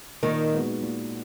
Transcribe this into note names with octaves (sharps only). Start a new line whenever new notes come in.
A#2 D#3
G#3 B3 D#4 F#4
A#2